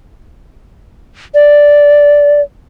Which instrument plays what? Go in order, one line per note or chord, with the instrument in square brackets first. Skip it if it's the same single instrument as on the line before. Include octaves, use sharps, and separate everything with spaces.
[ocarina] D5